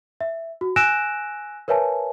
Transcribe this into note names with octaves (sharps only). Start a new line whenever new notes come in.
E5
F#4
G#5 E6 F#6 A#6 D7 E7
A#4 B4 C#5 E5 G#5 A5